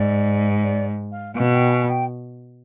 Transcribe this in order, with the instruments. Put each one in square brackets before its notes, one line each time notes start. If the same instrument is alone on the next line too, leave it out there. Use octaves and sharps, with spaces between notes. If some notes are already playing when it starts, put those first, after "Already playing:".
Already playing: [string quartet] G#2 [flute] D5
[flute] D5
F5
[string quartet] B2 [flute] F5
[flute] G5
G#5
G5